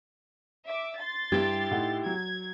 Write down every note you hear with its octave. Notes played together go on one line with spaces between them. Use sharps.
E5 D6
C6 A6
G2 E4 G4 G#6
A2 D#4 F#5
F#3 G#6